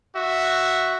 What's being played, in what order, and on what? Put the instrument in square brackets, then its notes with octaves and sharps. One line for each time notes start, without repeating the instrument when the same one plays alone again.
[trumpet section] F#4 E5